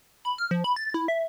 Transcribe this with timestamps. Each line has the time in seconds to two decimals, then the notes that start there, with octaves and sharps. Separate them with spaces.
0.25 B5
0.38 F6
0.51 F3
0.64 B5
0.76 A6
0.94 E4
1.08 E5